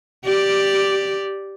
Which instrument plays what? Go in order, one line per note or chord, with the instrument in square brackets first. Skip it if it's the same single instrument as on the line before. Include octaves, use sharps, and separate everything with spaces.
[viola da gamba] G4 D5